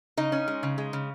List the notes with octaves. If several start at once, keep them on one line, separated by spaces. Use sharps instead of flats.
C#3 D#4 D#5
C#4
G#3
C#3
G#3
C#3